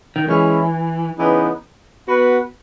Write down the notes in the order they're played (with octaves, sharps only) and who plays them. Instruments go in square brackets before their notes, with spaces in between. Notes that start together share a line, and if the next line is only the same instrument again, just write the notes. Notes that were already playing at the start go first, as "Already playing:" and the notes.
[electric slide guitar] D#3
[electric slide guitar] E3 [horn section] G#3 C#4 E4
[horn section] C#3 E3 B3 D#4
B3 F#4 B4